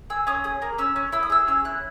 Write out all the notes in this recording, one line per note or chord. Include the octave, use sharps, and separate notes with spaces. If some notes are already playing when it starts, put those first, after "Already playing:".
G#4 E6
C#4 D#6
G#4 D#6
A#3 A#5
C#4 E6
C#4
E4 E6
D#6
G#4 E6
C#4 E6
E4 F#6